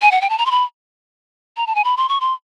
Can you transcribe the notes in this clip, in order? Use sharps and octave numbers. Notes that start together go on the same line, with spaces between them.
G#5
F#5
G5
A5
A#5
C6
B5
A#5
A5
G#5
B5
C6
C#6
C6